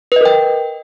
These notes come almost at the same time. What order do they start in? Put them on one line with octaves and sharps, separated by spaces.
B4 D#5 A#4 G5